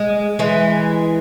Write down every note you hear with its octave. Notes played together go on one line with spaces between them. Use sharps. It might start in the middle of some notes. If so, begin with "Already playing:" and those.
Already playing: G#3
E3 G#3